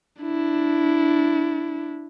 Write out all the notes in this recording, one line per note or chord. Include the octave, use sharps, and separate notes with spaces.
D4 E4